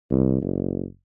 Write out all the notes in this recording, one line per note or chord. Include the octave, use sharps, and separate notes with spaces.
C2
F#1